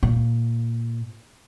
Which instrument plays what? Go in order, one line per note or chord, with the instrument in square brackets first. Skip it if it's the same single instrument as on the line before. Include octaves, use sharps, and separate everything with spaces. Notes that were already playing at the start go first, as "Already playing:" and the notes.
[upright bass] A#2